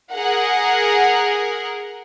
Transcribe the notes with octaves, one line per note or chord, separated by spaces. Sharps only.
G#4 A#4 F#5